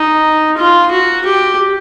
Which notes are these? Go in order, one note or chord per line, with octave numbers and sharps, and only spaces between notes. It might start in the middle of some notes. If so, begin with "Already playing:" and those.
Already playing: D#4
F4
F#4
G4